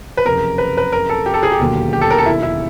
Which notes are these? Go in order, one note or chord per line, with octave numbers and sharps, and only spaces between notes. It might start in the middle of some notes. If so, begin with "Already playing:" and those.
B4
F#1 F2 C3 A#4
B4
B4
A#4
A4
G4
A4
G#4
G4
E1 D#2 D3 F#3 A#3
G4
A4
A#4
A4
E4
E4